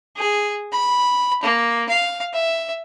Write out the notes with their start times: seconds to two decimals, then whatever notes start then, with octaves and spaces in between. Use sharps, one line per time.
0.16 G#4
0.72 B5
1.43 A#3
1.89 F5
2.33 E5